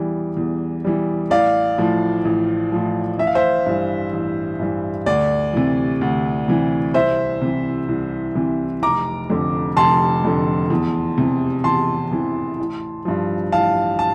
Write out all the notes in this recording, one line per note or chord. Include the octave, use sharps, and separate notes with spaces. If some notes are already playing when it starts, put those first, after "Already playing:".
Already playing: E2 E3 G3
E2
E3 G3
A1 D5 F5
A2 F3
A1
A2 F3
A1 E5
F5
C5 E5
G2 E3
A1
G2 E3
D2 D5
C3 E3
D2
C3 E3
C2 C5 E5
C3 E3
C2
C3 E3
F1 A#5 D6
F2 D3
F1 A5 C6
F2 D3
E2
C3 E3
E2 A5 C6
C3 E3
A1
G2 F3
A1 F5 A5
A5